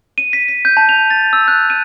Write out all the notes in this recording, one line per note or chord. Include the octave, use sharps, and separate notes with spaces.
D#7
B6
B6
G6
A5
F7
A6
E6
F#6
D#7